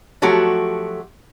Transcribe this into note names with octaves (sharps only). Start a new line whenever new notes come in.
F3 F#3 A3 F#4 G4